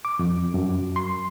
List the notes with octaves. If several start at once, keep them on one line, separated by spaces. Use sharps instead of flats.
D6
F2
F#2
C6